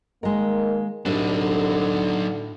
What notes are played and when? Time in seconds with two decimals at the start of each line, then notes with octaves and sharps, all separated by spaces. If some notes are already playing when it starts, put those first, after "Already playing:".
0.23 D#3 G#3 A#3 A#4
1.06 C2 A2 D3 F#3 D4 D#4